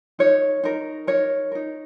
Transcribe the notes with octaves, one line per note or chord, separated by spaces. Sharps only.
D#4 A#4 C#5
D#4 A#4
D#4 A#4 C#5
D#4 A#4